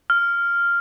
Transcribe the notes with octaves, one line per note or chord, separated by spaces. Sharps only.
F6